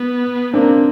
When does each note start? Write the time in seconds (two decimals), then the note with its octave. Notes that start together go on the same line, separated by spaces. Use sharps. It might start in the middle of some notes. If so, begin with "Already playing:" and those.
Already playing: B3
0.54 A#3 C4 D4